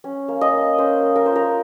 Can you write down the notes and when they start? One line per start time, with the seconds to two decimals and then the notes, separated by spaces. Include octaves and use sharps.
0.04 C#4
0.28 A#3
0.41 D#5
0.53 A#3
0.78 C#4 C5
1.03 A#3
1.16 A#4
1.26 F4 C5
1.35 A#4